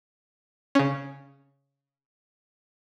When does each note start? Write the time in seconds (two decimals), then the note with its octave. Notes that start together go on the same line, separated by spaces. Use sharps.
0.75 C#3 C#4